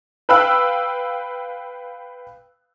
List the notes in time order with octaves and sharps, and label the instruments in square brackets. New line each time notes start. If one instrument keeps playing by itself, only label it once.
[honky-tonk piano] B4 F5 G5 B5 E6 F#6